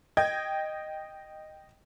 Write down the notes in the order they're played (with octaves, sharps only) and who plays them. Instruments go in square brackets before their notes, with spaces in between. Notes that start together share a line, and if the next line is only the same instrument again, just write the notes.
[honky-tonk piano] D#5 G5 G#6